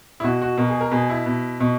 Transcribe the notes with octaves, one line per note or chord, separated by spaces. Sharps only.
E4
B2 F#4
F#4
B2 A#4
G#4
A#4
B2 G#4
E4
B2
B2